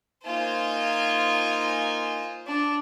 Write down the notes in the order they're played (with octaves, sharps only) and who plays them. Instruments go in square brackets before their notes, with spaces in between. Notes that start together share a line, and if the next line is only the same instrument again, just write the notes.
[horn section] A#3 D#4 G#5 [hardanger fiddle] F4 C5
[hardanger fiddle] D4